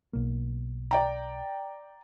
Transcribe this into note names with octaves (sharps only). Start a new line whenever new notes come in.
B1 A#3
D5 G5 A#5